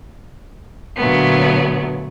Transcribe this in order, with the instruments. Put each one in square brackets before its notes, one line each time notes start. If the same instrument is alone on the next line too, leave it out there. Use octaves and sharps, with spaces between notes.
[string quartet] A#2 D3 F#3 A3 B3